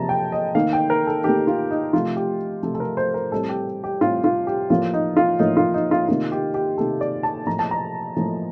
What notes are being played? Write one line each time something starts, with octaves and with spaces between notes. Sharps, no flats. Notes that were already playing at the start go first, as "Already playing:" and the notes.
Already playing: C3 F3 A#3 A5 A#5
G5
D#5
D#3 A#3 F5
G5
A#4
A4
D#3 A#3 G4
F4
D#4
C3 F3 A3 F4
G4
C3 F3 A3 A4
A4
A#4
C5
A#4
A2 G3 C4 A4
G4
G4
A2 G3 C4 F4
F4
G4
A2 F3 A#3 F4
D#4
F4
A2 F3 A#3 D#4
F4
D#4
F4
C3 D#3 A#3 F4
G4
G4
C3 D#3 A#3 A4
D5
A5
A2 F3 A#3 A#5
A5
A#5
A2 F3 A#3